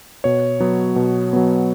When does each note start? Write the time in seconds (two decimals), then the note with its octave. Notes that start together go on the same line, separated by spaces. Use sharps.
0.24 B2 C#5
0.60 F#3 B3
0.96 B2
1.33 F#3 B3